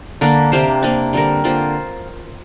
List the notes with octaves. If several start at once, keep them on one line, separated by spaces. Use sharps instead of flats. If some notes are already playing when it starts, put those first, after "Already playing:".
D3 A#3 D4
C3 A#3 G4 C5
C3 A#3 D4
D3 G3 C4 A#4
D3 A#3 F4 C5